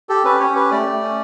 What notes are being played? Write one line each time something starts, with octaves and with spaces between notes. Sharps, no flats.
G4 A4
C#4 B4
C#4 C#5
G4 B4
A3 D5
A3
C#4